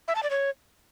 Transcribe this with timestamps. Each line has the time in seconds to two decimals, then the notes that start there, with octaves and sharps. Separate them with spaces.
0.08 E5
0.15 A5
0.23 D5
0.31 C#5